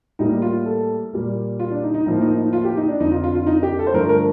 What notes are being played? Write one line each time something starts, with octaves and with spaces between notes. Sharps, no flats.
A2 G3 A#3 D#4
F4
A4
A#2 G3 A#3
F4
D4
D#4
D#4
A2 F3 A#3 D#4
D#4
D#4
F4
G4
D#4
D4
F2 D3 F3 D#4
F4
F4
F4
D#4
G4
A4
C5
G2 D3 F3 A3 A#4
A#4